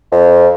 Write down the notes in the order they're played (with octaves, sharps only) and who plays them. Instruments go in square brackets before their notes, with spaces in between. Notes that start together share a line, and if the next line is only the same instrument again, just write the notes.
[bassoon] F2